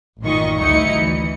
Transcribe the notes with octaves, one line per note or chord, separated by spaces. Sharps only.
A1 F#2 A#2 D#3 D#5 C#6
D2 G3 D#4 E4 D#5 C#7
E3